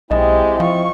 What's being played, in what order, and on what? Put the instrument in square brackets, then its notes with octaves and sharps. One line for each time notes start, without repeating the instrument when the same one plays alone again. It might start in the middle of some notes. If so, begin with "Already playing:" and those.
[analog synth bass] B1 [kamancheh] G#3 G4 [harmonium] C4 E4 [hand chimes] D#5
[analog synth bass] F3 [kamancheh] F4 C#6